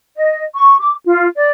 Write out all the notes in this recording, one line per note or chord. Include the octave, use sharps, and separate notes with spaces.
D#5
C#6
D6
F4
D5